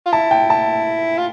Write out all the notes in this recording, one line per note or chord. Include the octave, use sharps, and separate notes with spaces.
F4
E4 A5
G5
A5
F4